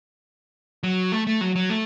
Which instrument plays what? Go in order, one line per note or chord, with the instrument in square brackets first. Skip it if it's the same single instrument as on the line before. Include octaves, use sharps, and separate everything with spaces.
[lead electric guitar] F#3
A3
A3
F#3
F#3
A3